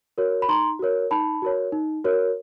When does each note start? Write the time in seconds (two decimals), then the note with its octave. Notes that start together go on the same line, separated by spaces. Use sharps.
0.18 F#4 A#4 C#5
0.42 B5
0.49 D#4 A#5 C6
0.79 F#4 A#4 C#5
1.11 D#4 A5 B5
1.42 F#4 A#4 C#5
1.72 D#4
2.04 F#4 A#4 C#5